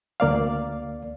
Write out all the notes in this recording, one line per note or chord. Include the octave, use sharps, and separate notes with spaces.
D2 A#3 D5 F5